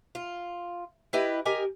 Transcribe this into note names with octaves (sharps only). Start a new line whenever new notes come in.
F4
E4 G4 B4 D#5
G4 A#4 D#5 G#5